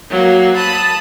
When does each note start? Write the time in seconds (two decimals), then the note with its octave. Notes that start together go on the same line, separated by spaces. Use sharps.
0.10 F#3 A#3
0.55 A5 B5 D#6